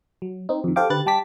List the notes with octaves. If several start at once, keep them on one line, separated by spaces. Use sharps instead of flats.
F#3
C4 D#4
F2 D#3
G4 A4 C5 F5 G5 D6
D3 G4 B4 F#6 A6
G3 G5 A5 D6 B6